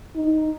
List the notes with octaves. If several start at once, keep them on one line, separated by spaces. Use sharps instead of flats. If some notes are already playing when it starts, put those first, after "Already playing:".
D#4